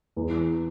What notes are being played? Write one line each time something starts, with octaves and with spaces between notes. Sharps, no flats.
E2